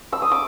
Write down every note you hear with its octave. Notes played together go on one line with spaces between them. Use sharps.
E6
D#6
D6